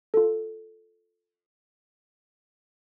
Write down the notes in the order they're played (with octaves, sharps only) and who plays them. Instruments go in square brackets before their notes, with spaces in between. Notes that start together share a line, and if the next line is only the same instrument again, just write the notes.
[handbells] F4 A4